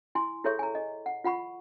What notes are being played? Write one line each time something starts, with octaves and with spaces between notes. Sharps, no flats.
E4 G#5 C6
E4 G#4 A4 C#5 E5 C#6
G#5 A#5
D#5
F#5
F4 F#5 B5 C#6